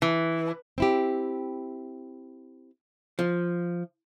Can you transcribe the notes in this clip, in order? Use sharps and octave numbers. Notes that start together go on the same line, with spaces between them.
E3
C4 E4 G4
F3